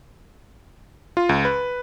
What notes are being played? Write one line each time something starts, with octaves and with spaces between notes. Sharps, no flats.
F4
C#2
B4